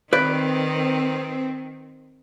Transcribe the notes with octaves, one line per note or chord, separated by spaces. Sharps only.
D#3 C4 B4 D5